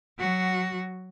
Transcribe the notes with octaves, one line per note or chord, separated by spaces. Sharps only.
F#3 F#4